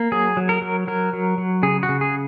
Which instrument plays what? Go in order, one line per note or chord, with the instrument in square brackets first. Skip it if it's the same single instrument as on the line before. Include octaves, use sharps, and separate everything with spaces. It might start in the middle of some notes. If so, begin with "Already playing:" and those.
Already playing: [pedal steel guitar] A#3
F#3 G#4
F#3
A#4
F#3
F#3 A#4
F#3
F#3
C#3 G#4
F#4
C#3
G#4